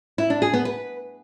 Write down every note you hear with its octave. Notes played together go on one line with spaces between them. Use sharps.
E4
D4
G#4
B3
B4